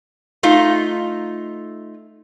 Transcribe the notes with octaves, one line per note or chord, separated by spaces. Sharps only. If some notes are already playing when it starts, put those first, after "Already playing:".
A3 D#4 F4